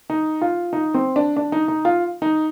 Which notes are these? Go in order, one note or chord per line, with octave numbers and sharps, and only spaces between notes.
D#4
F4
D#4
C4
D4
D4
D#4
D#4
F4
D#4